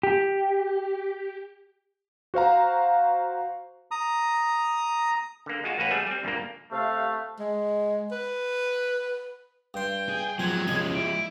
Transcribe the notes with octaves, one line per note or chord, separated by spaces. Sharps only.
G4
F#4 C5 F5 A#5
A#5 D#6
D3 A#3
G#3 F4 F#4
A1 A#3 F#4 B4 C#5
G3 A3 G#4 E5 F#5
G3 C4
D2 G2 A#2 A#3
C3 A3 F5
G#3
B4
G2 G5 C6
G#4
F3 F#3 G#3 C4 G#6
C2 F3 G#3 C#4 D#5
E4 D7